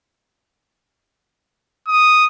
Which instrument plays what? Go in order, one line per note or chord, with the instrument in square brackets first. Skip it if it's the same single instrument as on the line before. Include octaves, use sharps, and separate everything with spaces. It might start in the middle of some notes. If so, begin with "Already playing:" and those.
[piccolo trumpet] D#6